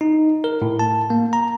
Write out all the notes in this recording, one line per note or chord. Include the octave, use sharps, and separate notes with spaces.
D#4
A#4
A2
A5
A#3
A#5